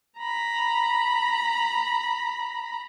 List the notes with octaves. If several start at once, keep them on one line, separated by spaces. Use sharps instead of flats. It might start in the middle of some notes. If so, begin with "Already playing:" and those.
A#5 B5